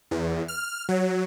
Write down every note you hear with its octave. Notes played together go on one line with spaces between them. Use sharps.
E2
F6
F#3